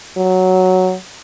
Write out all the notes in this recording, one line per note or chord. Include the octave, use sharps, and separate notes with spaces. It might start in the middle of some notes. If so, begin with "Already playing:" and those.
F#3